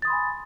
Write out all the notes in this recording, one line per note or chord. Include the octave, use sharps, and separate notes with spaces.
G#5 B5 C6 D#6 A6